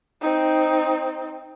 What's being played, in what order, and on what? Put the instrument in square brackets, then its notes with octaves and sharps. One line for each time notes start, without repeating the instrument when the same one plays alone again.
[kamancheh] C4 D#4